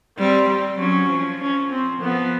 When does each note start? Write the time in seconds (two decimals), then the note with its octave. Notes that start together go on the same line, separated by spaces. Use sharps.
0.18 G3 C4
0.49 G3
0.79 F#3 C#4
1.11 F3
1.41 C#4
1.71 C4
2.02 F3 B3